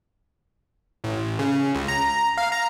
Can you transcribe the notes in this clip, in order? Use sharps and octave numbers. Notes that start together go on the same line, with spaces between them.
A1
C#3
C#2
A#5
F5
A#5